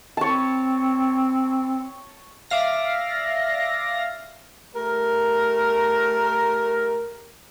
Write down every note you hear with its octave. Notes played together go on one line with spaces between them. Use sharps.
C4 C#5 A5
D5 E5 F5 A#6
A3 G4 A#4